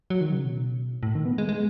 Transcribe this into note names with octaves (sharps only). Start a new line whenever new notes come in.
F#3
D#3
C#3
B2
A2
D#3
B3
G#3
G#3